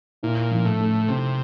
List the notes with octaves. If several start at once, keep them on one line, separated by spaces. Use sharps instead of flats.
A#2 E4
F3
A2
A3
C3 C4